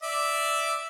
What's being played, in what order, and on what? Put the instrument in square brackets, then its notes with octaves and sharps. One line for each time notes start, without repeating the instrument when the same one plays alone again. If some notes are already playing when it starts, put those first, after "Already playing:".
[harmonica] D5 E5